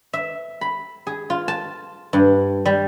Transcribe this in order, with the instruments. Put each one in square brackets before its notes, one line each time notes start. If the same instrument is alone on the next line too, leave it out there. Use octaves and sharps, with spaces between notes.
[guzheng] E5
B5
G#4
F4
A5
G2
G3